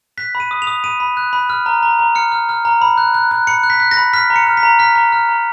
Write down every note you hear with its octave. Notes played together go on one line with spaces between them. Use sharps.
F#6 B6
B5
D#7
D#6
F7
D#6
B5 D#7
B5
F#6
B5
F6
A#5
A#5
A#5
F6 C#7
F6
F6
A#5
B5
F#6
F#6
F#6
B5 C#7
F#6
B6
F#6
A#6
B5
F6 B6
A#5
C#7
F6
B6
A#5
F6 B6
A#5
F6
A#5